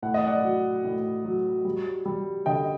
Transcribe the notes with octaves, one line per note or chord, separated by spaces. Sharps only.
A2 F#5
D#5
D5 F#5
F#3
A2
F#3
G3
G3
D3 D#5 G5